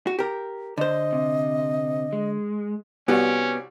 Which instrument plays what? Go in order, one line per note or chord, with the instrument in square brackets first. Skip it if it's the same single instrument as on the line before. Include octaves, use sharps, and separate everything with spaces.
[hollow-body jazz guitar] F#4
G4 A#4
[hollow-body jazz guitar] D3 C5 [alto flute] D#5
[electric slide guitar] C3
G#3
[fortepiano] C2 G3 F#4 [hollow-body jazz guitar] B3 [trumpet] C#4